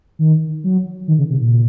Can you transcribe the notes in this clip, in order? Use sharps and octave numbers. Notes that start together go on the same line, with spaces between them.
D#3
F#3
D#3
C#3
C3
A#2